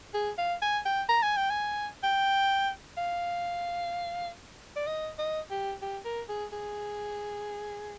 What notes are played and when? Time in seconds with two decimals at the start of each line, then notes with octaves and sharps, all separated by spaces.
0.14 G#4
0.38 F5
0.62 G#5
0.85 G5
1.09 A#5
1.22 G#5
1.37 G5
1.50 G#5
2.03 G5
2.97 F5
4.76 D5
4.87 D#5
5.18 D#5
5.50 G4
5.82 G4
6.05 A#4
6.29 G#4
6.52 G#4